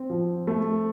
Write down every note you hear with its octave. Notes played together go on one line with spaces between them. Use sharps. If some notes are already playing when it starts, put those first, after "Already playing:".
Already playing: C4
F3
A3